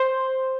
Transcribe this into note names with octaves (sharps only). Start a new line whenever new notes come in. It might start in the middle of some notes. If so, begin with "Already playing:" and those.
Already playing: C5